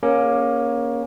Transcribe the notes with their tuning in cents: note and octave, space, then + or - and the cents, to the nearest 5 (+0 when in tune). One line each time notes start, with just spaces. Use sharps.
A#3 +20 C#4 +0 G#4 +0